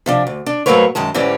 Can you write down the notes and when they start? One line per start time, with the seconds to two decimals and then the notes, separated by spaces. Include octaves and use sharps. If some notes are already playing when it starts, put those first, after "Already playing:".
0.06 C3 F3 D4
0.27 D2
0.46 D4
0.66 G#2 F#3 A3 A#3 B4 C#5
0.95 F#2 D#3 G#3 A5
1.14 G#2 D3 E3 G3 C#4